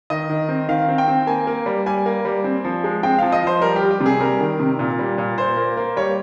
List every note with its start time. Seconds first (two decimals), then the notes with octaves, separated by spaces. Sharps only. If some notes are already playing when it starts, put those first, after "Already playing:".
0.10 D#3 D#5
0.30 D#3
0.49 C4
0.69 D#3 F5
0.88 C4
0.98 G5
1.08 C4
1.27 A#3 G#5
1.47 A#3
1.66 G3
1.86 G3 G#5
2.06 A#3
2.25 G3
2.44 C4
2.64 F3
2.84 G#3
3.03 C4 G5
3.18 F3 F5
3.32 D#5
3.42 F3 C5
3.61 G3 A#4
3.76 G4
3.82 G3
3.91 G4
4.01 C3
4.06 G#4
4.20 G3 A#4
4.40 D#3
4.60 C3
4.79 A#2
4.99 G3
5.18 A#2
5.38 A#2 C5
5.57 A#3
5.77 A#3
5.96 G3 C#5